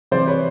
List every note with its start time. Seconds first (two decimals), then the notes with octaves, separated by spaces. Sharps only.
0.11 C3 E3 G3 C5 D5
0.27 B4 C#5